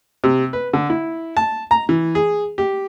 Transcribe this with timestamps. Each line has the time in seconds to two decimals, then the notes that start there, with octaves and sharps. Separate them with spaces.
0.24 C3
0.53 B4
0.73 D3
0.90 E4
1.37 A5
1.71 A#5
1.89 E3
2.15 G#4
2.58 G4